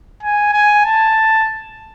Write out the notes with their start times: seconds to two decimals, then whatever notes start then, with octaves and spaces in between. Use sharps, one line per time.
0.23 G#5
0.54 G#5
0.85 A5